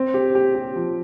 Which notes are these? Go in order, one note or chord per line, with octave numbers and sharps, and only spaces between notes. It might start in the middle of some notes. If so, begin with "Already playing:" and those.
Already playing: C4
G4
G4
G4
F3